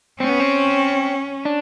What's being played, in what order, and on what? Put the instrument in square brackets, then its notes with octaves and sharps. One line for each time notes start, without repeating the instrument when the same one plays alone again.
[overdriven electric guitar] C4 [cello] C#4
[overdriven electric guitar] B3
C4
D4